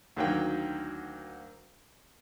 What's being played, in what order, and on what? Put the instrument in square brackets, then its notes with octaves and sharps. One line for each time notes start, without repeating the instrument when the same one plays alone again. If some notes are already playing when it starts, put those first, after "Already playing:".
[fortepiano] D2 D#3 F#3 A#3 G5